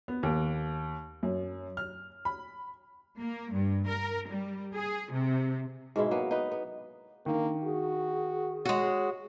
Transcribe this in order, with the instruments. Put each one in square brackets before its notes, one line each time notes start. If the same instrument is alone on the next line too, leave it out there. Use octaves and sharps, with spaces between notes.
[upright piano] B3
D#2
F#2
F6
B5
[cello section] A#3
G2
A#4
G3
G#4
C3
[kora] G#2 B2 G#3 E4
F#3 A#3 B3
D#4 B4
B3
[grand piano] D#3 [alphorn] A#3 [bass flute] D4
[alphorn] F#4 [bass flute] G#4
[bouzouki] G#3 F#4 [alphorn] C#5